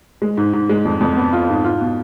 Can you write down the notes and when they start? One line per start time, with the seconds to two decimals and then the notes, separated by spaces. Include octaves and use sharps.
0.22 G#3
0.37 G#2
0.53 G#2
0.69 G#3
0.85 F2
1.01 F2
1.17 B3
1.33 F4
1.49 G#2
1.64 F4
1.81 B2